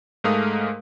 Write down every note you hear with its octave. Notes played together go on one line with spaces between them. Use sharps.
G#2 G#3 A3 A#4 F5 D#6